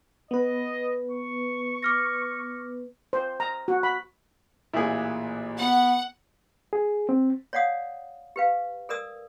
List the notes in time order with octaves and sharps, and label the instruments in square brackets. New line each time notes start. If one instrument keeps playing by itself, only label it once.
[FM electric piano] B3 B4 [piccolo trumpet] D#5
[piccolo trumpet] C#6
[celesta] D6 F6 A#6
[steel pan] C5
A#5
F#4
B5
[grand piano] A1 A#2 [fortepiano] E4 G#4
[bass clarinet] B3 [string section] F#5
[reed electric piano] G#4
C4
[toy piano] C#5 D5 F5 F#5 D#6
G4 B4 F5
A4 A#4 D5 D#6 E6